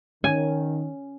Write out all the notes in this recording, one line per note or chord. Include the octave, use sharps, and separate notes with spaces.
D#3 C#4 G#5